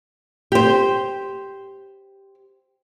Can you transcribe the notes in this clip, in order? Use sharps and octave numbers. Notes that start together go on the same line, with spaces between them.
G4 C5